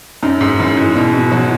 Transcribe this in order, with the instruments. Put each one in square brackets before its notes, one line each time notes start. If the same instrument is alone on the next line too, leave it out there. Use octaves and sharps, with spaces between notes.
[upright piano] F#2 [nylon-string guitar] D#4
[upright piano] G#2
[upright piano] F#2 [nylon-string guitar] E3
[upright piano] G#2
[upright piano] B2 [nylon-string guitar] D#5
[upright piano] B2
[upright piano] F#3 [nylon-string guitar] F#4